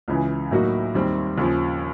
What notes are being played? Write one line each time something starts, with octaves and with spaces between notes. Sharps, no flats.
C#2 C#3 E3
A2 F#3 A#3 D#4 F#4
D#2 D#3 G3 C4
D#2 C#3 F3